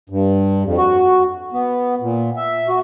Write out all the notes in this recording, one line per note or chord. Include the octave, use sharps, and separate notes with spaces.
G2
F2
F#4
B3
A#2
E5
F#4